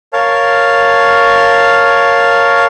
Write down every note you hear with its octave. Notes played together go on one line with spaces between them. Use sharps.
A#4 C#5 F5 A5